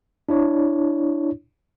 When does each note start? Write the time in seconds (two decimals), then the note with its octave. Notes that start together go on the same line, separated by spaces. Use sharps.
0.29 D4 E4 C#5